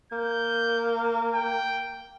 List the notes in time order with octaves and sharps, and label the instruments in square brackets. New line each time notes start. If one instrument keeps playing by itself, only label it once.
[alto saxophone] A#3 [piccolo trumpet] G6
[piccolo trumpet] G5